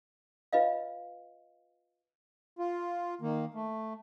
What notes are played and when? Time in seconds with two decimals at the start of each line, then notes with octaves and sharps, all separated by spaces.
0.53 F4 B4 D#5 F5
2.59 F4
3.21 D#3 A#3
3.54 A3